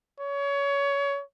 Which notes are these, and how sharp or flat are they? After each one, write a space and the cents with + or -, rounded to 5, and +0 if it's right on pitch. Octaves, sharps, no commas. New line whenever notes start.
C#5 +25